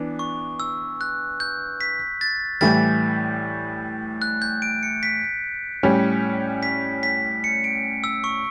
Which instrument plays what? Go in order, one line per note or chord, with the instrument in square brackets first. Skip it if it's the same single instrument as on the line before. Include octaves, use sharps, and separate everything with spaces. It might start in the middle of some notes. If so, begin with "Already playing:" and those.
Already playing: [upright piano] E3 B3 D4
[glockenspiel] C#6
E6
F#6
G6
B6
A6
[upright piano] A2 E3 G3 [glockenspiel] A6
[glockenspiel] F#6
G6
D7
C#7
B6
[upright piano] A2 G3 C#4
[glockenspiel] B6
B6
C#7
D7
E6
C#6